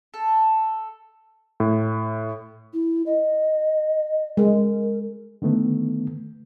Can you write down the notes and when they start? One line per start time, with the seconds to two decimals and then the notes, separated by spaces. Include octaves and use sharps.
0.14 A4
1.60 A2
2.74 E4
3.06 D#5
4.37 G#3 A#4
5.42 D3 D#3 A3 B3